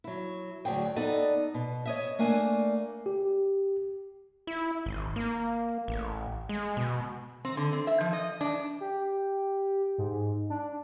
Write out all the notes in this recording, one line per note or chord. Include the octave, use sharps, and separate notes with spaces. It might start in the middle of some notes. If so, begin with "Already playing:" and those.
F#3 E4
D2 B2 F#3 G#4 G5
B3 D#4 A4 D5 D#5
B2
C#5 D#5 E5
A3 A#3 D4 G#5
G4
E4
G#1
A#3
A1
G#3
B2
C4
D3
C4
E5
F3
D#5
D4
G4
G#2
D4